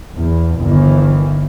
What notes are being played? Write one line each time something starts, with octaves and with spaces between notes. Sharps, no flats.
E2
G1 D#3 E3